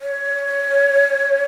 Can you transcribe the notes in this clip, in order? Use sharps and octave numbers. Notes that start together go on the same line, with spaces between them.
C#5